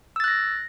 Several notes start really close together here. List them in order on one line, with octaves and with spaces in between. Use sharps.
E6 A6 F#6 A#6